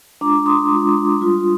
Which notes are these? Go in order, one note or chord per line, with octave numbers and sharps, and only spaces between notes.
G#3 D4 F4 A#5 D6
C6 D#6
G#3 D4 F4
G3 D4 F4